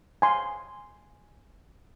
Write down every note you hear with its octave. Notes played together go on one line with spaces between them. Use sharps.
G#5 C6